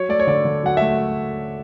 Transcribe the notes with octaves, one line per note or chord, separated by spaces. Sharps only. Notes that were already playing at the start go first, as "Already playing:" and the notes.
Already playing: F#3 C#5
A3 D5
C#5
D3 D5
D3
F#3 F#5
A3 E5